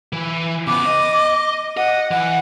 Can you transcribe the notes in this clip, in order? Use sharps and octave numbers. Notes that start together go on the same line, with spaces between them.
E3
C#3 B3 D6
D#5
D#5 F#5
E3 F#5